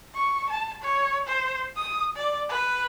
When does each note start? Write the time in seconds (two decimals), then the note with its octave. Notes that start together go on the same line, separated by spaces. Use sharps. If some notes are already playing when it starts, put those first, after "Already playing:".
0.15 C#6
0.50 A5
0.82 C#5
1.27 C5
1.76 D#6
2.16 D5
2.50 B4